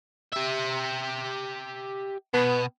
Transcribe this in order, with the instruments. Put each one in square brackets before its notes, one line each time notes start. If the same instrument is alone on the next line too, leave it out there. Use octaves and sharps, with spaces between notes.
[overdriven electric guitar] G4 E5
[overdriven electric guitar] B2 [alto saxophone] B3